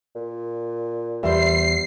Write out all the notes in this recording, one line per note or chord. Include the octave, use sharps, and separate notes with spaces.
A#2
E2 G3 C5 E5 C7